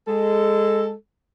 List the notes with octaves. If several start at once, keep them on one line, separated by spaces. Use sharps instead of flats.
G#3 A4